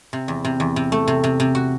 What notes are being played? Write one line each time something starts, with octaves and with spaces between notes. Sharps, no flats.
C3
E2
C3
E2
C3
A3
C3
C3
C3
F#4